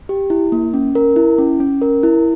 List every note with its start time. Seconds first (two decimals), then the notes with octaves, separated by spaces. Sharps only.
0.09 G4
0.30 E4
0.52 A#3
0.73 C#4
0.95 A#4
1.16 E4
1.38 C#4
1.60 C#4
1.81 A#4
2.03 E4